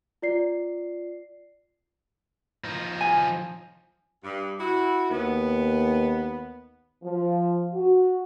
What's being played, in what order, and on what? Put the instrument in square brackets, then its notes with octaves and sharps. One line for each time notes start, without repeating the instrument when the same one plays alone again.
[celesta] F4 D5 C7
[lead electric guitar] F3 D#4
[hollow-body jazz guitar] G#5
[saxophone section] G2
E4 F#4
[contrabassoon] D#2 [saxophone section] B3
[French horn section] F3
F#4